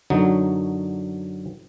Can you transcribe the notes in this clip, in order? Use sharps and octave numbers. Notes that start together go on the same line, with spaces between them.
F#2 D3 F#3 D#4